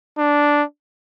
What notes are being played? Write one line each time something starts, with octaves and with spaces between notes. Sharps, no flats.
D4